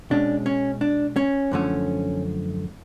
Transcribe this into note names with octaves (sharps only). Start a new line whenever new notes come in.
B2 G#3 C#4 D4
C#4
D4
C#4
F#2 D3 F3 A3 C#4